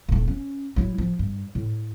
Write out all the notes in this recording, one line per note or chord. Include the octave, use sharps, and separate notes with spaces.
D#1 A3
C#4
F#3 E4
F3
G2
A2